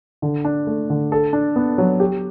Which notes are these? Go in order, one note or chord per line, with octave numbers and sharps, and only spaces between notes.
D3
D4
A3
D3
A4
D4
B3
F#3
G4